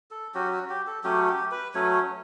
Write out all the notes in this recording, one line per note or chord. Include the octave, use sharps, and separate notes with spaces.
A4
F#3 C#4 F#4 G4
F#4
G4
A4
F#3 A3 C#4 G4
G4
B4
F#3 A3 C#4 C#5